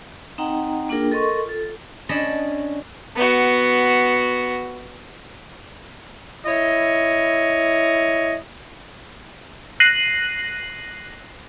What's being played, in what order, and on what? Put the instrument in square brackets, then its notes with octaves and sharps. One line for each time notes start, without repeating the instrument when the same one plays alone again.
[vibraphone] C4 D#4 D#5 F#5 G5 A#5
A#3 D4 F4 G#4 A#4 G5
A4 A#4 D#5 C6 C#6
F4 A4
[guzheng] C#4 D4 D#5 A5 B5
[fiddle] B3 F#4
[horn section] E4 C#5 D#5
[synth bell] F#6 A#6 C7 D#7 F#7